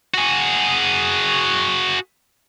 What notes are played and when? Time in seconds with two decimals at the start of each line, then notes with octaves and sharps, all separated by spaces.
0.14 F#4 G#4